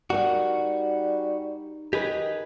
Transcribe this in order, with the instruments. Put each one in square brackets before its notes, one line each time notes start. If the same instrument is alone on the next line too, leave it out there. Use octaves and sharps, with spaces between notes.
[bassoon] G3 [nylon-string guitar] D#4 A#4 F#5 [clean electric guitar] F#4
[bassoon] D#3 [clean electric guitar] G4 G#4 B4